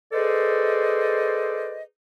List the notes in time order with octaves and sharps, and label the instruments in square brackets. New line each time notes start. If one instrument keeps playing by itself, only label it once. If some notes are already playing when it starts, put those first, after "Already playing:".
[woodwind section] G#4 A4 B4 C5 D5 D#5